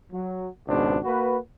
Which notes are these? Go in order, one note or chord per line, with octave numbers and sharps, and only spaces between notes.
F#3
G#1 C#2 B2 D4 C5
A#3 F#4 B4